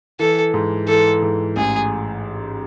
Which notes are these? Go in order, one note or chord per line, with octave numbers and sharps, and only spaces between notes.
E3 A4
G#2
E3 A4
G#2
A1 G#4